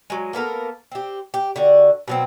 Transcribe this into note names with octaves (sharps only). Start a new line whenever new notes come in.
F#3 G#3
A#3 B3 A4 A#4
C4 G4
G4
D3 F#4
B2 F#3 C4